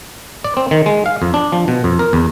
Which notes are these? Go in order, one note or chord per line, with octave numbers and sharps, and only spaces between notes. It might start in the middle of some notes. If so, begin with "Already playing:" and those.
D5
C4
D#3
G#3
F5
F2
D4
F3
B2
F2
A#4
E2